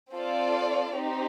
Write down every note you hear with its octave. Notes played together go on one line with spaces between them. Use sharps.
C4 F4 A4 D5
C4 D#4 G4